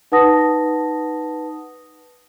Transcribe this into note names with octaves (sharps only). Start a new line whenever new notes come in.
D#4 B4 F#5 A5 D#6 A#6